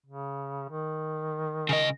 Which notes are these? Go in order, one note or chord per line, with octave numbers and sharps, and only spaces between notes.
C#3
D#3
C#3 D#5